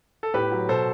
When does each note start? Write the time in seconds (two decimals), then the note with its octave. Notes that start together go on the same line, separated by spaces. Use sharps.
0.23 A4
0.34 A2 G4 B4
0.52 F#3
0.69 B2 A4 C5